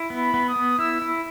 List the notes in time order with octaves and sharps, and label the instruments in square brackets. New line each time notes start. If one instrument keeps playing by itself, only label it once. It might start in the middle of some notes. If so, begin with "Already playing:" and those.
Already playing: [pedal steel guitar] E4
B3
[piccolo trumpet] B5
[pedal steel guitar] B3
[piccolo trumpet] D#6
[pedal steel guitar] B3
[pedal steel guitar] E4 [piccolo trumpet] E6
[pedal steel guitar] E4